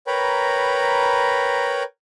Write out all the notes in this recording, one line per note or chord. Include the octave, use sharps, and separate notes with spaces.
A#4 B4 C#5 G5 A#5 B5